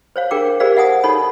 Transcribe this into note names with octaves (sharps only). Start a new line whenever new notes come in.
C5 C#5 F5
D4 G#4 A#4 G5 D6
G4 G#4 A#4 C5 D5 F5
D5 E5 F#5 G#5 D#6
D#4 A4 C#5 B5